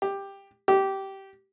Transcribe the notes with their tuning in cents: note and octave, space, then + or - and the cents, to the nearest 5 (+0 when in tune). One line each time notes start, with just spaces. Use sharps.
G4 +10
G4 -15